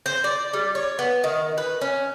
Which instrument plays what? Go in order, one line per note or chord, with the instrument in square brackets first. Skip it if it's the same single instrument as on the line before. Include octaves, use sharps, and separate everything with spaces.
[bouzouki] C5
D5
G3
C#5
B3
D#3
B4
C#4